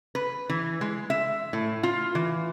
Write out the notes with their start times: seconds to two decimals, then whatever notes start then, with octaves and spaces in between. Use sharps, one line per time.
0.15 B4
0.49 E3
0.81 G#3
1.10 E5
1.53 A2
1.83 F4
2.15 E3